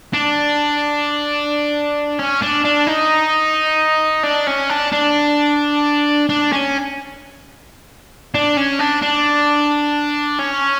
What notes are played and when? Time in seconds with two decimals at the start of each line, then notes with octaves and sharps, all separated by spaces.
0.13 D4
2.19 C#4
2.42 D4
2.64 D4
2.87 D#4
4.23 D4
4.47 C#4
4.70 D4
4.92 D4
6.29 D4
6.52 C#4
8.35 D4
8.57 C#4
8.79 D4
9.02 D4
10.39 C#4